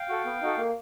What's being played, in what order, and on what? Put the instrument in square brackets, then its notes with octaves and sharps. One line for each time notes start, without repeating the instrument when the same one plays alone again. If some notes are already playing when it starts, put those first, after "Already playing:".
Already playing: [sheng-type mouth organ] F5 G5
F#4 A4
B3
D#4 F#4 A4
A#3